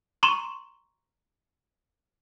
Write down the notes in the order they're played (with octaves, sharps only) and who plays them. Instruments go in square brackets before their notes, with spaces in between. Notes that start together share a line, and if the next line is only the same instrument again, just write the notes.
[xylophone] A#5 C6 C#6 D#7 E7